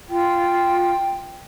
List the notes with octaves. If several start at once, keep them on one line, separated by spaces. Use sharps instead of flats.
F4 G5